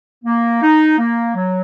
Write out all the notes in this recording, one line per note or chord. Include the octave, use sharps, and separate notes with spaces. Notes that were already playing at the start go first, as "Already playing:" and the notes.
A#3
D#4
A#3
F#3